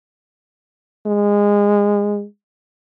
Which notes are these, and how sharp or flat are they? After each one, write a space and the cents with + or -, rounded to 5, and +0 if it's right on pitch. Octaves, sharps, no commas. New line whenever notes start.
G#3 -20